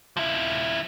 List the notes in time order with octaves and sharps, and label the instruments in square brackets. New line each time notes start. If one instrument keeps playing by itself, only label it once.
[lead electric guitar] F3 E4